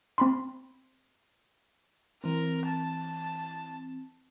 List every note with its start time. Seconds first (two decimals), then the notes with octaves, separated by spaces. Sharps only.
0.18 C4 B5 C6
2.24 E3 C4 A#4
2.66 A5